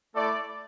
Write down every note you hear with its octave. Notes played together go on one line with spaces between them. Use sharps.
A3 E4 A4 D5